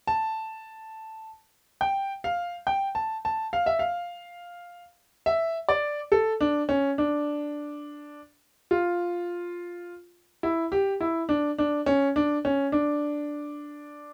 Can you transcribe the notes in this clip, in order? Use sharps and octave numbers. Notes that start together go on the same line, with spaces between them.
A5
G5
F5
G5
A5
A5
F5
E5
F5
E5
D5
A4
D4
C#4
D4
F4
E4
G4
E4
D4
D4
C#4
D4
C#4
D4